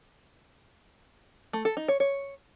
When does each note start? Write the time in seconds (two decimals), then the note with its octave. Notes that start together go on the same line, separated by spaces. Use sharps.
1.53 A3
1.65 A4
1.77 D#4
1.88 C#5
2.00 C#5